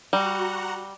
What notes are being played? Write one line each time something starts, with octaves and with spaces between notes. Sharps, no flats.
G3 F#4 F#5 A#5